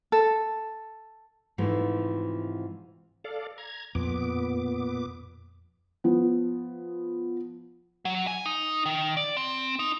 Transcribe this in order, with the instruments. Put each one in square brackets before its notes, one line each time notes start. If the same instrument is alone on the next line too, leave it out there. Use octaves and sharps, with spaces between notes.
[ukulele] A4
[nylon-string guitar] G#2 C3 E3 F3 A3
[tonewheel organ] A4 D5 F5
A#5 G#6
[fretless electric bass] F2 [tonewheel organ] A#2 B3 D6
[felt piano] F3 B3
[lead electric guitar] F#3
G#5
D#4
D#3
D5
C4
D#4